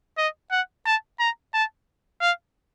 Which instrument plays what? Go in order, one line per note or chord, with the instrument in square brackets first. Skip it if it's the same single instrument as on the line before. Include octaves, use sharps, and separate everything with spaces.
[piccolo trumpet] D#5
F#5
A5
A#5
A5
F5